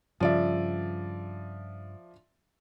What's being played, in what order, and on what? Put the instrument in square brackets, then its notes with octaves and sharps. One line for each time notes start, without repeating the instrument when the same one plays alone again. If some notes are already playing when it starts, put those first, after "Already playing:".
[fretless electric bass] G2 C#3 [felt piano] F3 D5 E5